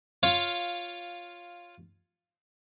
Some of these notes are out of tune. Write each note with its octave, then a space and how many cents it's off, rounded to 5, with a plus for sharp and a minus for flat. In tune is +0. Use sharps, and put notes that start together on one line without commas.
F4 +5 C#5 +0 F5 +0